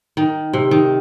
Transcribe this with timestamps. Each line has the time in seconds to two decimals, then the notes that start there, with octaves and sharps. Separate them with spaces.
0.17 D#3
0.53 C3
0.71 D#3